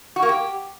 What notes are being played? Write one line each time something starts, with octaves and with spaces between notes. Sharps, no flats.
F#4
A#3
G4